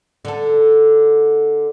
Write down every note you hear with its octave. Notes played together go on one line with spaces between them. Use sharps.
D3 A4